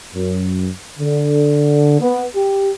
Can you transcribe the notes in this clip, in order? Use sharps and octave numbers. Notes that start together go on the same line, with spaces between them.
F#2
D3
B3
G4